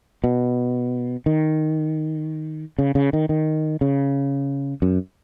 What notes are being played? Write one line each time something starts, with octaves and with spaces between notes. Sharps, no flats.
B2
D#3
C#3
C#3
D#3
D#3
C#3
F#2